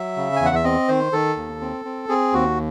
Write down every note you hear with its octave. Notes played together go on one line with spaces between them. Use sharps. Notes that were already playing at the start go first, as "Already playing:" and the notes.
Already playing: F#3 E5
C#3
E2 G#5
F#5
E5
C4 D#5
D#3 C5
D#3 A4
D#2
C4
C4
C4 G#4
D#2 F#4